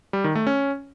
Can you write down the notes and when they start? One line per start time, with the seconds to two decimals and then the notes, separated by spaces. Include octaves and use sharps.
0.13 G3
0.24 D#3
0.35 A3
0.47 C#4